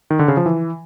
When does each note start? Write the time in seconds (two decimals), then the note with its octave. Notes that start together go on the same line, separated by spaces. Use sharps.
0.10 D#3
0.19 D3
0.28 C#3
0.37 F3
0.46 E3